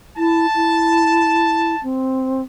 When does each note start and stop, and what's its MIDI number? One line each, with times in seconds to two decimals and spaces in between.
0.17 0.46 64
0.17 1.82 81
0.55 1.75 64
1.83 2.42 60